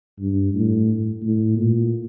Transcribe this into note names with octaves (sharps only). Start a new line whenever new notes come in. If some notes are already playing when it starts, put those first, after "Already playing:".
G2
A2
A2
A#2